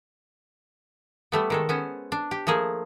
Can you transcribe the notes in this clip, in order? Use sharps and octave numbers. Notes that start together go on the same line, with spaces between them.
G3 A3 B3
D#3 G#3 A4
B3 C#4 C5
D4
G4
F3 A3 A#3 G#4